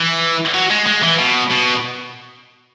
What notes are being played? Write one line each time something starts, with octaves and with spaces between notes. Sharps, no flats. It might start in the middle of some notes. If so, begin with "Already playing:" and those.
Already playing: E3
F#3
G#3
G#3
E3
B2
B2